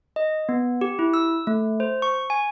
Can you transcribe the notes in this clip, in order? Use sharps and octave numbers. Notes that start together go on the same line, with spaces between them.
D#5
B3
G4
E4
E6
A3
C5
C#6
G#5